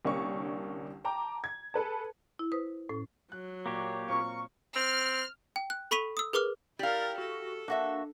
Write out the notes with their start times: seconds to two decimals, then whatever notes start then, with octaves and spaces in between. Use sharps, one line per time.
0.05 C2 D3 A#3 C#4 D4 C#6
1.05 G5 A5 A#5 D6
1.44 G#6
1.74 G#4 A4 B4 A5
2.39 E4
2.52 B4 C5 D#6
2.89 A2 C#4 A4
3.32 F#3 F#6
3.66 A#2 A#3 G4 C#5 D5
4.08 A#2 C4 F4 A#4 C#6
4.76 C4 F6
5.56 G5
5.70 F#6
5.91 A4 B5 C#6 B6 D#7 F7
6.17 D#6 E6
6.33 G#4 A#4 B4 D6 F6
6.79 E4 G4 A#4 D5 F5
7.18 F#4 A4
7.68 A#3 D4 F#4 E5